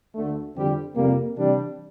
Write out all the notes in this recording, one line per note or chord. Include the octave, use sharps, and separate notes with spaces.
D2 D3 A3
F2 D3 G3 C4 G4
F2 C3 G3 A#3
C3 E3 G3 D4